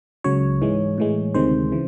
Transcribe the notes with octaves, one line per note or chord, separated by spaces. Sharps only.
C#2 C#3 F#3 C#5
G#2 E3 G#3
A2 E3 G#3
D2 C3 D#3 G#3 C5
C#3 E3